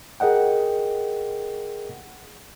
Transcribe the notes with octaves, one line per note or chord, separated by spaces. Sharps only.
G#4 A#4 D#5 F#5 G5